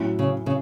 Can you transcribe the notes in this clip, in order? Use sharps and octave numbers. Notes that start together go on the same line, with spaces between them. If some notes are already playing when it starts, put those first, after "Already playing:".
Already playing: A2 F#3 C#4 E4
C#3
C#3